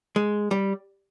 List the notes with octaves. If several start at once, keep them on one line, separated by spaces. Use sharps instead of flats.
G#3
G3